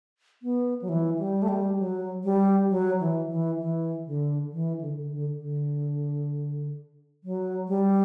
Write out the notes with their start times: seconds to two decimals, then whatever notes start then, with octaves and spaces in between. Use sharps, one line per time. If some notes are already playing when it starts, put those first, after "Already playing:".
0.43 B3
0.82 F#3
0.89 E3
1.19 G3
1.42 A3
1.48 G3
1.79 F#3
2.24 G3
2.70 F#3
3.00 E3
3.30 E3
3.60 E3
4.06 D3
4.52 E3
4.81 D3
4.98 D3
5.12 D3
5.39 D3
7.24 F#3
7.68 G3